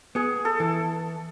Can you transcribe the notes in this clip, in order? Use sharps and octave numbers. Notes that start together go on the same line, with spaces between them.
B3 G#4
A4
E3